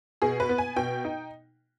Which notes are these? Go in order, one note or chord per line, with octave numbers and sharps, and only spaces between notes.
B2 G#4
B4
B3
G#5
B2 G5
D#4